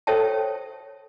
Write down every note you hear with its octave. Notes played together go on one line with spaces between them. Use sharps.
A4 C5 C#5 E5 G5 A5